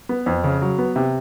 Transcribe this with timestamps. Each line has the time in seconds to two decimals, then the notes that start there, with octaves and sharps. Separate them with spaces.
0.09 B3
0.26 F2
0.44 C#3
0.61 F#3
0.79 B3
0.96 C3